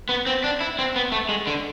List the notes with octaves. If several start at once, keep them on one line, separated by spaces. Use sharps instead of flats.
B3
C4
D4
E4
C4
B3
A3
G#3
D3